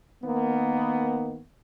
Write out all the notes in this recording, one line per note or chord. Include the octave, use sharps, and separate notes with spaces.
D#3 A#3 B3